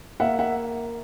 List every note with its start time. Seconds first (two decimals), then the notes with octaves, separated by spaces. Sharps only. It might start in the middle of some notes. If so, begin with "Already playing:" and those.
0.20 A#3 E5 F#5
0.39 E5 F#5